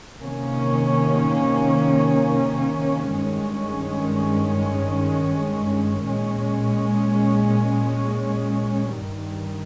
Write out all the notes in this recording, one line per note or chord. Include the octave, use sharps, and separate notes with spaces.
C3 D#3 A#3 C#4
G2 D#3 G#3 C#4
A#2 G#3 C#4
G2 D#3 G3